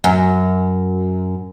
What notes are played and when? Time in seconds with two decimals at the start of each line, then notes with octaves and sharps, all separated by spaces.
0.04 F#2